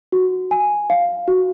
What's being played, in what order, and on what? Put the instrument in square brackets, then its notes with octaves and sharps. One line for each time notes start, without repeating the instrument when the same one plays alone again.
[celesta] F#4
G#5
F5
F#4